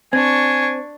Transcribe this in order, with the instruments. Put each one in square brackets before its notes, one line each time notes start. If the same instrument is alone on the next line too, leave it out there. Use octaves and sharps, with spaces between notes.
[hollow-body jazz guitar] C4 [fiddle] D4 C#6 [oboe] G#5